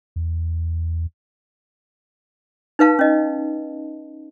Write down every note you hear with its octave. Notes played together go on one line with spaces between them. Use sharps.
E2
D#4 B4 F5 A5
C#4 D#5